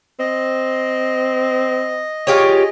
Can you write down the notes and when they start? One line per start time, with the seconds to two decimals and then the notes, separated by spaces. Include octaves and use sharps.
0.19 C4 D#5
2.27 F4 G4 G#4 C#5